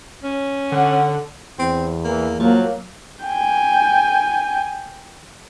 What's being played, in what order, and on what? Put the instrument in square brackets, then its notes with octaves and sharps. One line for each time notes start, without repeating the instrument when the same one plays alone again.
[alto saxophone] C#4
[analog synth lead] D3 [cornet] F#5
[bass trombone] E2 [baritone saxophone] C4
[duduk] E3 [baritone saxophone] A#3
[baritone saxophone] F3 [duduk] F#3 [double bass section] A#3
[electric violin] G5 G#5